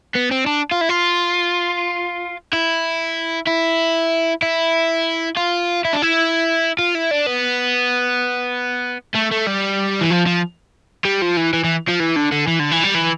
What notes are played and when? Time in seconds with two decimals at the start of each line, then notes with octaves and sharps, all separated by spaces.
0.16 B3
0.31 C4
0.46 D4
0.71 F4
0.81 E4
0.89 F4
2.53 E4
3.47 E4
4.42 E4
5.37 F4
5.85 E4
5.93 D4
6.02 E4
6.79 F4
6.95 E4
7.11 D4
7.26 B3
9.15 A3
9.32 A3
9.47 G3
10.01 E3
10.11 F3
10.26 F3
11.05 G3
11.22 F3
11.37 E3
11.53 E3
11.64 E3
11.88 F3
12.00 E3
12.16 D3
12.32 D3
12.47 E3
12.59 D3
12.72 E3
12.84 G3
12.95 E3